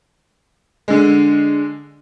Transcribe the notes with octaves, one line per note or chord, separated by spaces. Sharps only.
D3 G#3